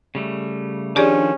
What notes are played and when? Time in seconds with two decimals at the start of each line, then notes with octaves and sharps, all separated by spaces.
0.15 C#3 G3 A3
0.96 D#3 F3 C#4 D4 G4 G#4 D5